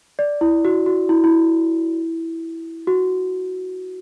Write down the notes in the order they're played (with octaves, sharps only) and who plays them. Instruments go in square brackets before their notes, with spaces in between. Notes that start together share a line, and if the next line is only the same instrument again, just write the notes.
[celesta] D5
E4
F#4
F#4
E4
E4
F#4